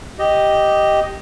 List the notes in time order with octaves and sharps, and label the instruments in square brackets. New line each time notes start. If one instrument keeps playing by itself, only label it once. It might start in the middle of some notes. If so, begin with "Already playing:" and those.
[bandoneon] G4 D#5